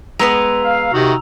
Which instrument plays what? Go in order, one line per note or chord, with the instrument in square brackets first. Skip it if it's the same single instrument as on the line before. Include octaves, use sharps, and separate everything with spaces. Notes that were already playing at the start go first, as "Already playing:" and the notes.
[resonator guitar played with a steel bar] G#3 B3 B4 [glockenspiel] A#5 E6 F7
[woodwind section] F5
[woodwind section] C3 [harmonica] D#3 F#4